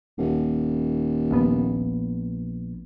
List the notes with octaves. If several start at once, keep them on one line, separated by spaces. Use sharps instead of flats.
D#1
A#1 B3